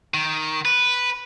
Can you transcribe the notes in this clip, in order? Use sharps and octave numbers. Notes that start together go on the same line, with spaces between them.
D#3
B4